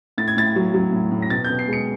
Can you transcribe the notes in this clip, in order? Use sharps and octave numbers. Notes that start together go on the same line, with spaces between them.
A2 A6
G#6
A2 A6
F#3
F#3
A2
A2
A#6
B2 A6
B2 G6
C7
G#3 C#7